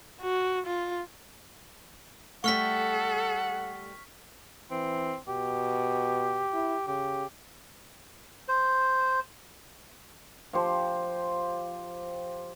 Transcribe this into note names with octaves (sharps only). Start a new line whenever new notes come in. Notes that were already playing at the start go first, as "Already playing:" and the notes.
F#4
F4
G3 A3 A4 F#5 C#6 F6 B6
E3 C4
B2 G4
E4
C#3 G4
C5
F3 G4 C5